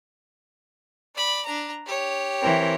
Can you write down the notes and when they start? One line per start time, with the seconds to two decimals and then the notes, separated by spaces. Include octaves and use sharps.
1.16 D5 B5
1.45 D4 A#5
1.86 G4 C#5
2.42 E3 C4 A#4